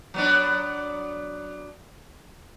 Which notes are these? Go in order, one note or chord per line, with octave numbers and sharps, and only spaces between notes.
F#3 B3 D4